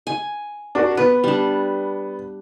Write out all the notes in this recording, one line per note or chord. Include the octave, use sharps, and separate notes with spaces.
G#5
D4 F#4 A#4
B3 B4
G3 D4